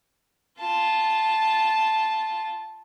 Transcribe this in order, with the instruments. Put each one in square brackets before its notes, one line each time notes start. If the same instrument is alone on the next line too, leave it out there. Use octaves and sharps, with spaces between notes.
[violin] F4 A5